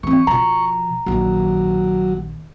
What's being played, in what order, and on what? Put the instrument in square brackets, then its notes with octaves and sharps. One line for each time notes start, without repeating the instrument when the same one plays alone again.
[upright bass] E3 C4 [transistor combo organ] C#6
[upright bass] B2 F3 [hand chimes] A#5
[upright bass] A#1 D#3 [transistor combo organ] F#3